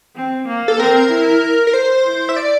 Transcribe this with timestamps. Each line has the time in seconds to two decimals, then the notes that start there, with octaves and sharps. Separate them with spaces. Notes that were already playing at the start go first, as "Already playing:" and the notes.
0.16 C4
0.47 A#3
0.68 A4
0.79 C4 A#4
1.11 E4
1.67 A#4
1.74 C5
2.05 E4
2.29 E5
2.36 D5